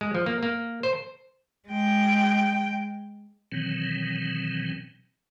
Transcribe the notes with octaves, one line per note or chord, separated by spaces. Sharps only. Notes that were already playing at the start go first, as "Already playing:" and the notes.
G#3
F3
A#3
A#3
C5
G#3 G5
B2 D#3 E3 F#3 C4